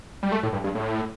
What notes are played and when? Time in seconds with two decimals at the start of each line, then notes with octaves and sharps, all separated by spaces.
0.23 G3
0.32 A3
0.43 A2
0.53 G2
0.64 G2
0.75 A2